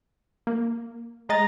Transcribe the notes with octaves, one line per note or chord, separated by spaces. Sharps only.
A#3
G#3 D#5 A#5 A6